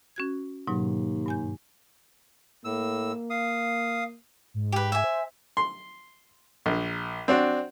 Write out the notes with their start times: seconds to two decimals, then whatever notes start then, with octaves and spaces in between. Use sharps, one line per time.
0.16 C#4 F#4 G#6
0.67 D#2 G#2 B2 F#3
1.26 G2 G#5 G6
2.65 A2 A#3 E6
3.30 F5 D#6
4.54 G#2
4.72 G4 B4
4.92 E5 G#5
5.04 C5
5.57 C6
6.66 A#1
7.28 C4 D4 F#4